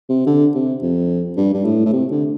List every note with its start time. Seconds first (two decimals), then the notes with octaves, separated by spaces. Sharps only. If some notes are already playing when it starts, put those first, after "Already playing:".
0.09 C3
0.26 D3
0.55 C3
0.82 F2
1.37 G2
1.54 G2
1.65 A2
1.85 A2
1.93 C3
2.11 D3